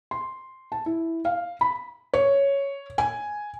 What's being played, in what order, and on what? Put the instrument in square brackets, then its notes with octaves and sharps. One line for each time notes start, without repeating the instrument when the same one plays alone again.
[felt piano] C6
A5
E4
F5
B5
C#5
G#5